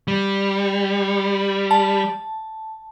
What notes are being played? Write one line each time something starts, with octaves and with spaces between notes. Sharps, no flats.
G3
A5